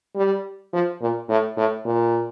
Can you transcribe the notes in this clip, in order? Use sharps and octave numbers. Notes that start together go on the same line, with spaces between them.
G3
F3
A#2
A2
A2
A#2